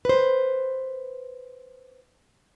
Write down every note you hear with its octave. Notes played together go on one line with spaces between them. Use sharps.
B4 C5